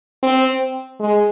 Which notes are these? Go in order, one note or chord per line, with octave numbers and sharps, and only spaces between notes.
C4
G#3